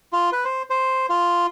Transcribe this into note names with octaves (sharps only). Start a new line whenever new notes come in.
F4
B4
C5
C5
F4